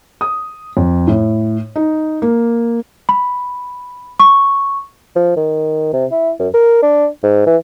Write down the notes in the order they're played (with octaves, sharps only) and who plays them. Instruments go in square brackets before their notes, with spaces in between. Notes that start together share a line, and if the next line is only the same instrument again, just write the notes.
[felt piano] D#6
F2
A2
D#4
A#3
[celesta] B5
C#6
[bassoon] F3
D#3
C3
E4
F#2
A#4
D4
G#2
E3